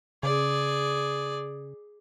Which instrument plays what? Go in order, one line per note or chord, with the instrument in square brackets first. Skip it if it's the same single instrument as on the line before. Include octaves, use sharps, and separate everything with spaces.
[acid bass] C#3 [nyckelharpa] G#4 D5